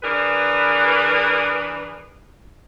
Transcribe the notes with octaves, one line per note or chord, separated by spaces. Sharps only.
E3 D4 G#4 A#4 B4